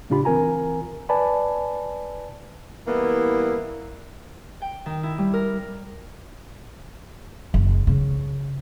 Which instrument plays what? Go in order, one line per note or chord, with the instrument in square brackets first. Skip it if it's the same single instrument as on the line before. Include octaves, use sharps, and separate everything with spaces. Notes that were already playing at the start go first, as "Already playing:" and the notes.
[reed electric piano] A2 C#3 D4 F4 G4 B5
E3 C4 F4 A#4 G#5 A#5
B4 D5 G#5 A5 B5
[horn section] E3 G3 A#3 B3 E4
[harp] G5
D#3
E4
G3
A#4
[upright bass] F#1
C#3